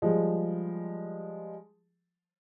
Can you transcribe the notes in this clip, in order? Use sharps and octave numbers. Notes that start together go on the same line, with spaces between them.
F3 G3 G#3